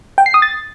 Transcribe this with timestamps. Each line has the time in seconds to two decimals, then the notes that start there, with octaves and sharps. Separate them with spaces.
0.18 G5
0.26 C7
0.34 D#6
0.42 A6